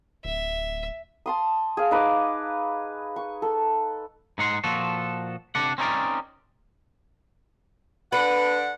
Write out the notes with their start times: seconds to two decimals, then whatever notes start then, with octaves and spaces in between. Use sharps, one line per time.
0.25 D1 E5
1.26 A5 C6 D#6
1.77 G#4 F5
1.91 D#4 B4 D6
3.16 C#6
3.42 A4
4.38 G#2 D#4 F#5 C6
4.64 A#2 F3 F#4 A4
5.55 C3 D4 D5 F#5
5.78 C4 C#4 D#4 A4 A#4 D5
8.12 D3 D4 B4 F#5